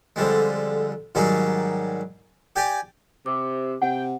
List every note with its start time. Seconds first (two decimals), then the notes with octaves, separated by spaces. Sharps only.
0.16 F2 D3 G3 G#3
1.15 G#2 D#3 F#3 G3 G#4
2.56 G4 D5 G5 G#5
3.26 C3 D6
3.82 C3 F#5 G5